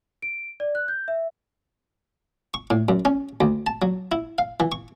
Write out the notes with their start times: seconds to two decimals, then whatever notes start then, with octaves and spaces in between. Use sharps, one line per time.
0.22 D7
0.60 D5
0.75 F#6
0.88 G6
1.08 E5
2.54 C#6
2.70 A2
2.89 F#2
3.05 C#4
3.41 D2
3.67 A5
3.82 F#3
4.12 E4
4.38 F5
4.60 E3
4.72 C#6